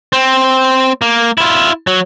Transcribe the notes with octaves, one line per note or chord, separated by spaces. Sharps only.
C4
A#3
E4 F4
F#3